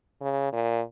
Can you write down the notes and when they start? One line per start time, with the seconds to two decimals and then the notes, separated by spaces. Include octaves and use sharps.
0.21 C#3
0.53 A#2